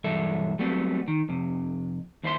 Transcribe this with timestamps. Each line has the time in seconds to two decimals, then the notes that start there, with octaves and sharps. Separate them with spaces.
0.04 B1 G2 E3 A4 E5
0.59 F#3 G3 A3 B3 C4
1.08 D#3
1.29 F2 C3
2.23 D#2 E4 C5 E5 C6